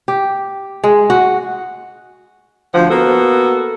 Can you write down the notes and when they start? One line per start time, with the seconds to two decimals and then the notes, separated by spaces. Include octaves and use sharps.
0.08 G4
0.84 G#3
1.10 F#4
2.74 D2 F3 F#5
2.90 A#3 B3 F#4 A4